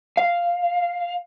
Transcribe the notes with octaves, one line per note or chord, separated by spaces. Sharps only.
F5